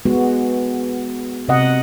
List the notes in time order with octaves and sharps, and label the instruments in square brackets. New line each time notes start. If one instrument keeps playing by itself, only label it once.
[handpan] G#3 B3 F#4
C3 D#5 F#5